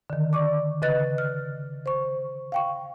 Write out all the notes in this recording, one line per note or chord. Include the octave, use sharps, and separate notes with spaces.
D3 D#3
D5 C#6 D6
C#3 B4 D#5 F#6 A6
F6
C5 C#6
F5 G5 C#6